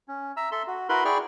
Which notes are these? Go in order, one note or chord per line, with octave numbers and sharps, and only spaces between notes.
C#4
E5 A#5 E6
A4 E5 C6
F#4
E4 F#4 A#4 B4 B5 C6
E4 G#4 D5 G5 C#6 F6